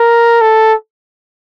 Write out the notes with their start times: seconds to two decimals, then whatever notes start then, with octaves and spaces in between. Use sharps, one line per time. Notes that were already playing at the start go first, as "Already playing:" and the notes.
Already playing: A#4
0.41 A4